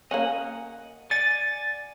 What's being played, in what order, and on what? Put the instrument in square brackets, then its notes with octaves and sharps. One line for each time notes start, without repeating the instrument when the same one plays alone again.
[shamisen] A#3 C#4 [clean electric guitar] D#5 F#5
[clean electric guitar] D5 F#5 G#5 [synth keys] A6